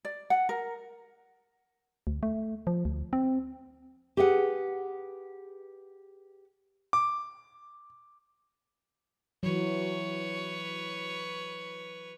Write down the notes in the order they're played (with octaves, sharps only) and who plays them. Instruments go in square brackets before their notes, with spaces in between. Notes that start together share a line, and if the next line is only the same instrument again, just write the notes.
[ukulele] D5
F#5
A#4
[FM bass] D2
A3
F3
D2
C4
[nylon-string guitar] G4 G#4 B4 F5 F#5
[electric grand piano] D6
[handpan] E3 F#3 [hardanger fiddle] B4 C#5